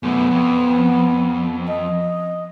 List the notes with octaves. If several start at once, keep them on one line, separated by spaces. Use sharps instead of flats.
F#2 A3 B3
F2
D#5